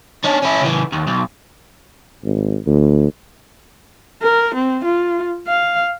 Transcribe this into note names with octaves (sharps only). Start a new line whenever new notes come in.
C#4 D4
C#4 E4
C#3 E3
D#2
B1
G#1
D2
A#4
C4
F4
F5